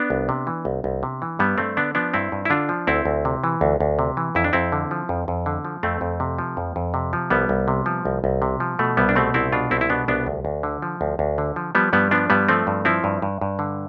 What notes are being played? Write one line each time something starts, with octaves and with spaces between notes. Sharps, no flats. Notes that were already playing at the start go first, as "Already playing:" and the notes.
Already playing: B3 D4
C2
C3
E3
C2
C2
C3
E3
G2 G3 B3
G2 A3 C4
D3 B3 D4
F3 B3 D4
G2 C4 E4
G2
E4
D3 D4 F4
F3
D2 C4 E4
D2
C3
E3
D2
D2
C3
E3
F2 E4
D4
F2 C4 E4
D3
F3
F2
F2
D3
F3
F2 A3 C4
F2
C3
F3
F2
F2
C3
F3
C2 G3 B3
C2
C3
F3
C2
C2
C3
F3
B2 A3
C2 G3 B3
D4
B2 A3 C4
C2 C4 E4
B2 D4 F4
C2 C4 E4
E4
B2 B3 D4
C2 B3 D4
D2
D2
D3
F3
D2
D2
D3
F3
F3 G3 B3
G2 G3 B3
F3 B3 D4
G2 G3 B3
F3 A3 C4
G2
F3 C4 E4
G2
G2
G2
D3